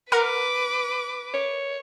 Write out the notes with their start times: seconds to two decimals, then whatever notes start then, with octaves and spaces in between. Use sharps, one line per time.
0.12 A#4 B4 F#5 A#5 D6
1.34 C#5